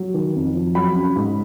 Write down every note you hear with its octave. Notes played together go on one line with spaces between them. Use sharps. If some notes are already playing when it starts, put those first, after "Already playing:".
Already playing: F#3
D#3
F2
F3
F#3 B5
C#3
G#2